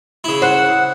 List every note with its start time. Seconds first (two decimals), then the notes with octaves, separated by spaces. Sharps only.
0.24 C#3 E4
0.42 C5 F#5